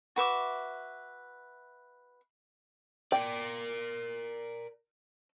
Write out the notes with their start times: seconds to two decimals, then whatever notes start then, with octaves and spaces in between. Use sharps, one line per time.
0.16 F#4 B4 E5 D6
3.12 A#4 D5 G5